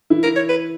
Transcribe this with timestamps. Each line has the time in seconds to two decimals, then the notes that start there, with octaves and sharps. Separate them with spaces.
0.10 E3 E4
0.23 A#4
0.36 C#5
0.49 B4